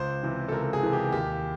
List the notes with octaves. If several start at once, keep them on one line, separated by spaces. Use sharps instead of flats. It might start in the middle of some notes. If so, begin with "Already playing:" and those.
Already playing: C#2 C5
C3 E3
A4
C#2 A#4
G#4
C3 E3
G4
D#2 G4